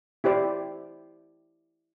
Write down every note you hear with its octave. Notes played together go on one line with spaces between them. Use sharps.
E4 G4 C5 D5